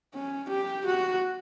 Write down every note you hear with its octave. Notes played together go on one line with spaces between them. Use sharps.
C#4
G4
F#4